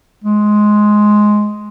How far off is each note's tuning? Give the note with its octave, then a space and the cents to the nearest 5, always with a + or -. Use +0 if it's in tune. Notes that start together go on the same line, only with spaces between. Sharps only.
G#3 +10